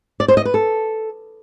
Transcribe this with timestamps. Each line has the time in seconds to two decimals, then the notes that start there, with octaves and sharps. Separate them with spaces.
0.20 D5
0.28 C5
0.37 D#5
0.45 B4
0.54 A4